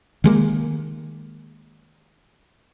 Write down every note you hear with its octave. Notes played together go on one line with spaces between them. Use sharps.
D#3 G#3 A#3